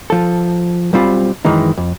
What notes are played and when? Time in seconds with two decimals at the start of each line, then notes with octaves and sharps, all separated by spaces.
0.10 F3 A4
0.93 B1 G3 C4 F4 C5 B5
1.45 F#2 D#3 E3 G#3 D#4
1.77 F2